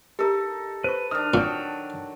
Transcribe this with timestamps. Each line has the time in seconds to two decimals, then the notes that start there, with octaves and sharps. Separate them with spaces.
0.19 D#4 G4 A4 A#4
0.84 B4 C5 C#6
1.11 D#3 D4 D#6 F6
1.34 A#2 F#3 G5